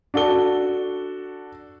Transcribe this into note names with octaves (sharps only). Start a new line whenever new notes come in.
D4 F#4 A4 G7